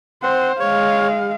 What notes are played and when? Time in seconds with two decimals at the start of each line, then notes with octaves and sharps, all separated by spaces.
0.23 C4 C5 F#5
0.60 G#3 C#5 F5